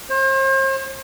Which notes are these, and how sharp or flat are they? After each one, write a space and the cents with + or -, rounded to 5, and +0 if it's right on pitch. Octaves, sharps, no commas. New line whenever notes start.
C5 +40